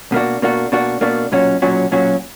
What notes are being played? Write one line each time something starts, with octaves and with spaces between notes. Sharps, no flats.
B2 A#3 D4 F#4
B2 A#3 D4 F#4
B2 A#3 D4 F#4
B2 A#3 D4 F#4
B1 A#2 F#3 C#4 F#4
B1 A#2 F#3 C#4 F#4
B1 A#2 F#3 C#4 F#4